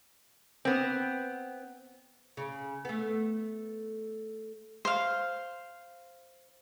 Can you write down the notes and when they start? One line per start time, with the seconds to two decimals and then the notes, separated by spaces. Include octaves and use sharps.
0.65 B3 C4
2.37 C#3
2.85 A3 B3
4.85 C5 F5